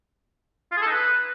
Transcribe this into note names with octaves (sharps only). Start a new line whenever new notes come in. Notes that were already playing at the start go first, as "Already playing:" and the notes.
F4
G#4
A4
D#4
B4